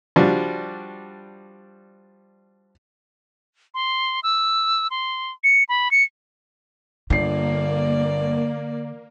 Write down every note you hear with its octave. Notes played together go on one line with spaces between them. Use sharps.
F3 G3 D4 F#4
C6
E6
C6
C#7
B5
C#7
G1 D3 A#3 D5 C7